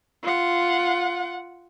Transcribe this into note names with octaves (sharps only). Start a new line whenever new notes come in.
F4 F#5